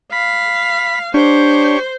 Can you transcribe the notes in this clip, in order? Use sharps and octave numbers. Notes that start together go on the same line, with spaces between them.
F5 B5
D4 G4 C5 C#5